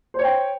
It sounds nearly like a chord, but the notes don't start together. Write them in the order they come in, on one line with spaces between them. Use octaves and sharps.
C5 C#5 G5